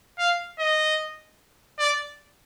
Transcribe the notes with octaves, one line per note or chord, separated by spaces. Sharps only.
F5
D#5
D5